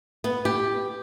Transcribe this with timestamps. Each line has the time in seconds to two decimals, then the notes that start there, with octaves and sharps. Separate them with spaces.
0.24 B3
0.45 G4